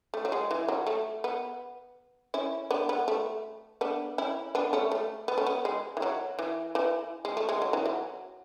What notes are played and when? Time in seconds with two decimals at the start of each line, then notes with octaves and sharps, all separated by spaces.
0.14 A3
0.25 F#3
0.32 G#3
0.51 E3
0.69 F#3
0.87 A3
1.24 B3
2.34 C#4 E4
2.71 B3 D4
2.89 B3
3.08 A3
3.81 B3 D4
4.18 C#4 E4
4.55 B3 D4
4.73 A3 C#4
4.92 A3
5.28 B3
5.38 A3 C#4
5.47 B3
5.65 G#3
5.97 E3
6.02 F#3
6.39 E3
6.75 E3
7.25 G#3
7.37 A3
7.49 G#3
7.62 F#3
7.73 E3
7.86 F#3